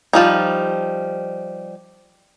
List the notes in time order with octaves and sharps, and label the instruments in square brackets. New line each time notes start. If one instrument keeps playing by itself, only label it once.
[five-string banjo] F3 G3 D#4